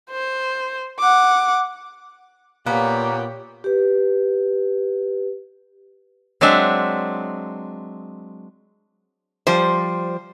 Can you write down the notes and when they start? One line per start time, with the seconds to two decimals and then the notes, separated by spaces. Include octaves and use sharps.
0.10 C5
0.99 F#5 D6
2.67 A#2 A#3 B3 G4 C#5
3.64 G4 B4
6.41 F#3 G#3 C4 D4 E5
9.47 F3 G3 C5